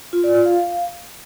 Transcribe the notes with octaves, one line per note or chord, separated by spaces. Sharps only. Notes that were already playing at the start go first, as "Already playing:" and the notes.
F4
D5
F4
F5